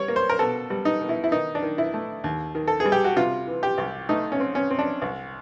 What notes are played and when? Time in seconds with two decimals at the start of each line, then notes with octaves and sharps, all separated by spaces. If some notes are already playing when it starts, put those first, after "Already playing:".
Already playing: G3 C#5
0.08 A#3
0.16 C5
0.29 A#4
0.39 B2 A4
0.70 G3
0.85 D#4
1.01 B2
1.09 E4
1.24 E4
1.32 D#3 D#4
1.55 D4
1.62 D#3
1.78 E4
1.94 A3
2.24 D#2
2.55 D#3
2.68 A4
2.80 G#4
2.85 G3
2.92 G4
3.04 F#4
3.16 C3 F4
3.47 E3
3.63 G4
3.78 C2
4.09 A3 D#4
4.32 C#4
4.40 C4
4.55 C#4
4.70 C4
4.79 D4
5.02 C2